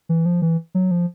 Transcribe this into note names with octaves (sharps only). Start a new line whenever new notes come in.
E3
F3
E3
F#3
F3